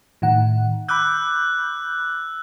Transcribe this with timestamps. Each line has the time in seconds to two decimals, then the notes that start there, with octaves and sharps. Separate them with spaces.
0.22 A2 D#3 F#5
0.89 B5 D6 E6 F#6 G6